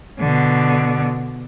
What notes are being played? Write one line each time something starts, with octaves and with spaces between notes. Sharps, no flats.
B2 D3